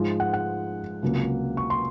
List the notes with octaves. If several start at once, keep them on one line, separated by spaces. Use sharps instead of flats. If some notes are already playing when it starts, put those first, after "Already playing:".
Already playing: G#2 F3 G#3
F#5
F#5
C#2 C3 F#3 A#3
C#6
C6